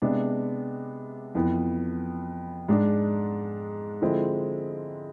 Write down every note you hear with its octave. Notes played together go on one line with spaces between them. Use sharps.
C3 G#3 B3 D4
F2 E3 B3
G#2 G#3 D4
D3 F3 G#3 C4 E4